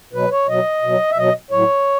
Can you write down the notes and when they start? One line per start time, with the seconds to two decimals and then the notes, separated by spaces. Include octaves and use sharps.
0.13 B2 F#3 B4
0.31 C#5
0.47 B2 F#3 D#5
0.82 B2 F#3
1.11 E5
1.17 B2 F#3 D#5
1.51 A2 F#3 C#5